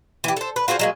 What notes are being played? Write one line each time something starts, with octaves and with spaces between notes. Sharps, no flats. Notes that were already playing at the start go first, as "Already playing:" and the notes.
E3 G4
A4 C5
B4
F4 F#4 G#4 C5
F#3 G#3 A#3